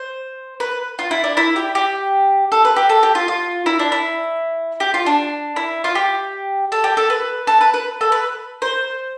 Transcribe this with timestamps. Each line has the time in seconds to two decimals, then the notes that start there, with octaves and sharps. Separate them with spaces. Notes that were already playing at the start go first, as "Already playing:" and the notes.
Already playing: C5
0.60 B4
0.99 F4
1.11 E4
1.24 D4
1.37 E4
1.56 G4
1.75 G4
2.52 A4
2.65 B4
2.76 G4
2.89 A4
3.03 G4
3.15 F4
3.28 F4
3.66 E4
3.79 D4
3.92 E4
4.80 G4
4.94 F4
5.06 D4
5.56 E4
5.84 F4
5.95 G4
6.72 A4
6.84 G4
6.97 A4
7.10 B4
7.47 A4
7.61 B4
7.74 B4
8.01 A4
8.12 B4
8.62 C5